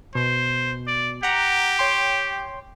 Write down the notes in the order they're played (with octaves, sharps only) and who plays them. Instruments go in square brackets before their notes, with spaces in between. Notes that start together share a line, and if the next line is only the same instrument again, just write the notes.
[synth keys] B2 [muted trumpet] C5
[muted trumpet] D5
[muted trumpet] G4 [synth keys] F#5 A#5
[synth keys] C#5 G5 C6